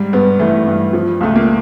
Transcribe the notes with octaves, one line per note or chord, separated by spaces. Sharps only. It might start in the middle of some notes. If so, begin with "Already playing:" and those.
Already playing: G#2 G3
G2 B3
E3 A3
G2
F3
C#2 A3
A#3